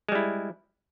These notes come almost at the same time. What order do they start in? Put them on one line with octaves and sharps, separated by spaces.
G#3 G3 E4